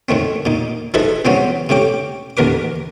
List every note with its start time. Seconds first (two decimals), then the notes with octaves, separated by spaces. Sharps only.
0.09 A2 D#3 A3 C4
0.45 A#2 D#4
0.94 F3 D#4 E4 G#4 A4 B4
1.25 C3 E3 F3 G3 B3 C#4
1.69 A2 C3 C#4 G5 D6
2.37 A1 D#2 A#4 B4 D6